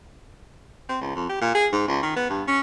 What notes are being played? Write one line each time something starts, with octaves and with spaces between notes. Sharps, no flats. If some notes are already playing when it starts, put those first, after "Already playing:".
C4
C#2
F2
G4
A#2
G#4
G#2
C#2
D#3
B3
G2
C#4